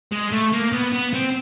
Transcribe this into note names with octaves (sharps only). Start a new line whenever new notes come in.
G#3
A3
A#3
B3
B3
C4